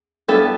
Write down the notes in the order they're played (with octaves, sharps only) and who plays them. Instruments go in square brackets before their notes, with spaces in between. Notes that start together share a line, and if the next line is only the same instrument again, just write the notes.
[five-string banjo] G3 B3 E4 A4 [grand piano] A3 D4